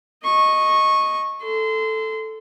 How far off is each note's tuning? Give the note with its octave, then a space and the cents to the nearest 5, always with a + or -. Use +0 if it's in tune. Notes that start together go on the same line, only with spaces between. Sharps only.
D#5 +0 C#6 -15
A4 +0 C6 -25